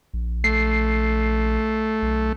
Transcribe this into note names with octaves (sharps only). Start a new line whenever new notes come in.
A#1
A3 C7
B1